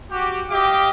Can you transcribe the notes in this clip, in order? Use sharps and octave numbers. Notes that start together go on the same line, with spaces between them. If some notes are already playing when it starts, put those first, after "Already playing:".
F#4 G4
G4 D#5 F5 G5 D6